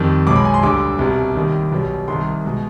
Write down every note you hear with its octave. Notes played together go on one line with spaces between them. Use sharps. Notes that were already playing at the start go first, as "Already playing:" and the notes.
Already playing: F2 D#3 G3
B1 B2 G#3 D6
B5
G#5
C6
D2 D3 G3 D6
C2 B2 G3
D#2 D#3 G3
B1 B2 G3
C2 C3 D#3 G3 C6
B2 G#3